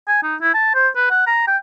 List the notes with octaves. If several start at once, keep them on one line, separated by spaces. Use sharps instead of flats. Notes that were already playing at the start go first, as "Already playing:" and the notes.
G#5
D#4
E4
A5
C5
B4
F#5
A#5
G5